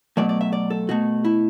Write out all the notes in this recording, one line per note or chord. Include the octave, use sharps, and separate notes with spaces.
B2 F#3 A3 D5
D5
E5
D5
A4
B2 A3 F#4
E4